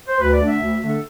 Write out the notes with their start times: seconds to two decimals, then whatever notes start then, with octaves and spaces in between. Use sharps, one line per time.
0.08 C5
0.19 D2 B4
0.33 D5
0.39 D3 A3 D4
0.46 E5
0.59 D2
0.80 D3 A3 D4
0.88 A4